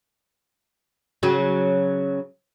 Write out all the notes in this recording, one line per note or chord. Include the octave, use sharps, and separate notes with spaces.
C#3 F#3